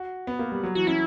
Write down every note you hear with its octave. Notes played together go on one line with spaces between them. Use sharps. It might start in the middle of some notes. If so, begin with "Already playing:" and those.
Already playing: F#4
B3
A#3
G3
F#3
E3 F#4
C#4 E4